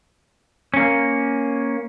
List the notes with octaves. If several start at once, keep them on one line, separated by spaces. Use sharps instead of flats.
A#3 C#4